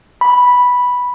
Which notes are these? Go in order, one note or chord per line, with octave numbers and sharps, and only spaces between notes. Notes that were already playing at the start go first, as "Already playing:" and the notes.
B5